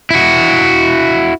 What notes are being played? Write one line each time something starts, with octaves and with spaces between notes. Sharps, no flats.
E4 F#4